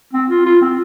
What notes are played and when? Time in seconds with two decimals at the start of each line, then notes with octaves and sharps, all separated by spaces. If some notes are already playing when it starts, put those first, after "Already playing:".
0.13 C4
0.30 F4
0.46 F4
0.61 C4